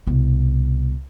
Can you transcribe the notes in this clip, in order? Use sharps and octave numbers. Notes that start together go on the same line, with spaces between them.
C2 B2